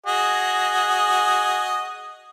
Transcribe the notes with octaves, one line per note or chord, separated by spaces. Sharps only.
F#4 G#4 D#5